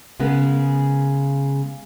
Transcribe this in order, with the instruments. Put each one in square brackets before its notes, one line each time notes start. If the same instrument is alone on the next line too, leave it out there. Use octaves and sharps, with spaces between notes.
[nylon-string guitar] C#3 G#3 B3 A#4